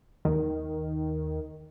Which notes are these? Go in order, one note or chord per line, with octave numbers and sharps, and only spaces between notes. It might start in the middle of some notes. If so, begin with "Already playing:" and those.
D#2 D#3